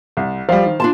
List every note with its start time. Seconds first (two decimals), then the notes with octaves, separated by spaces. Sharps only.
0.17 C2
0.49 F3 G3 C5 F5
0.66 D#3
0.80 D4 F4 A5 C6